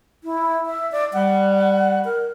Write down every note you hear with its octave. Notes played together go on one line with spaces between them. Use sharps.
E4
E5
D5
G3 F#5
A#4